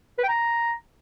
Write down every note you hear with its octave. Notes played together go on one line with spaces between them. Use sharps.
B4
G5
A#5